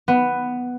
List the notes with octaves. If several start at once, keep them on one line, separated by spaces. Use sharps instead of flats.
B3